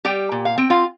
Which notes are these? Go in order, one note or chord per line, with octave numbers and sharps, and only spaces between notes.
G3 G4 G5
A#2
F5
C4 G5
F4 F5